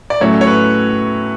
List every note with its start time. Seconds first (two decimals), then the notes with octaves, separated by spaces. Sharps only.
0.10 D5
0.21 A2 F#3 A3 C#4 E4 C#5
0.41 C#5
0.47 B4